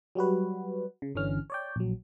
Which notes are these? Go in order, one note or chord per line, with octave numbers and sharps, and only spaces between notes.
F#3 G3 F#4 B4
C#3
G1 D3 E3 C#4 F6
C#5 D5 G5
A#1 F#3